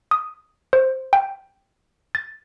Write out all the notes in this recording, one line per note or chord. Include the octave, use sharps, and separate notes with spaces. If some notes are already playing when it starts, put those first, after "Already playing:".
D#6
C5
G5
A6